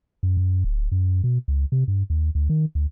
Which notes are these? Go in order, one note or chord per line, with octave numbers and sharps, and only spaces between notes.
F#2
F#2
D1
F#2
B2
C#2
C3
G2
D#2
D2
D#3
D2